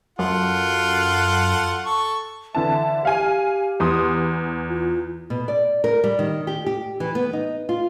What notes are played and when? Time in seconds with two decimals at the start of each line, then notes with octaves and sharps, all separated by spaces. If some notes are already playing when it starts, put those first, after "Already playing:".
0.19 F#2 F4 A4 F#5
1.85 A4 C#6
2.55 D3 E3 E5 A5
3.05 G4 F5 G#5
3.80 E2 C6 D#6
4.69 F4
5.30 B2
5.48 D5
5.84 A#4
6.04 G3
6.19 D#3
6.47 G4
6.66 G4
7.00 E3
7.15 B3
7.33 D#4
7.69 F4